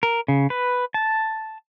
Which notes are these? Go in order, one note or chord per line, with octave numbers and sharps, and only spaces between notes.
A#4
C#3
B4
A5